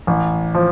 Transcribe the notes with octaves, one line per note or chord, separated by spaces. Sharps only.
A1
F3